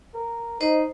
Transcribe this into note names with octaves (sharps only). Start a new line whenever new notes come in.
A#4
D#4 C5 D#5